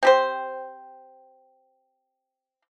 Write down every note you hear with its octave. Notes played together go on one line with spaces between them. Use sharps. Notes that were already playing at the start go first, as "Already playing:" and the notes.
C4 G4 C5